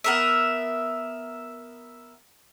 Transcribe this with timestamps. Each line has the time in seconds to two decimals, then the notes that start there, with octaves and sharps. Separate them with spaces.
0.04 B3 A#4 E5